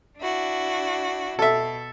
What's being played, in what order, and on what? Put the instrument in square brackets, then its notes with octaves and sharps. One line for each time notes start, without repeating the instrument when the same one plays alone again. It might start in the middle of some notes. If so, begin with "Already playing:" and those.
[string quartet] D4 E4 F#4
[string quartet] B2 [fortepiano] A4 E5